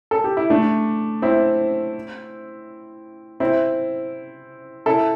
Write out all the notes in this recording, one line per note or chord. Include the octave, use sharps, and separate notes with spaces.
A4
G4
E4
A3 D4
C4 E4
C4 E4
E4 A4